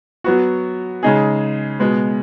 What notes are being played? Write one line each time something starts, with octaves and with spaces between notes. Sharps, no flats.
F#3 B3 F#4
C#3 G#3 D#4 G#4
B2 G#3 B3